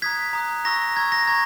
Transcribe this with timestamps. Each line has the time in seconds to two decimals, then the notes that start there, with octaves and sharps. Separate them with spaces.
0.02 A#5 D#6 F#6 G#6 B6
0.33 A#5 D#6 F#6
0.65 A#5 C#6 E6 A#6
0.96 A#5 C#6 E6 G#6
1.12 A#6
1.28 A#5 C#6 G#6